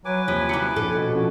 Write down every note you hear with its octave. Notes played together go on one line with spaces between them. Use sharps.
F#3 B4 G#5 D6
D#2 C3 F3 B6
F#3 G3 E4 F#6 C#7
A#1 A4
B2
F3 C#4 F#4